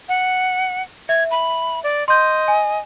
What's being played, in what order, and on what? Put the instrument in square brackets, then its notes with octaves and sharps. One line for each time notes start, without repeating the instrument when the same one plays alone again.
[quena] F#5
[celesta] E5 [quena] G#6
[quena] B5
D5
[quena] D#5 [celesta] C6 G6
[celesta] G#5